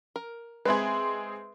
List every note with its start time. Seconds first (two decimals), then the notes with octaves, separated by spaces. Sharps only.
0.16 A#4
0.65 G#3 C4 G#4 B4 E5